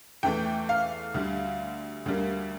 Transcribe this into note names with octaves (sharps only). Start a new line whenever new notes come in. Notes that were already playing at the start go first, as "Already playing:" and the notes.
E2 E3 A3 G5
F5
D2 D3 G3
D2 D3 G3 A#3